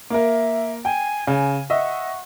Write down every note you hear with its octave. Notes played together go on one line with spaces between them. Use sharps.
A#3 A#4 E5
G5 G#5
C#3 G#5
D#5 E5 F#5 C#6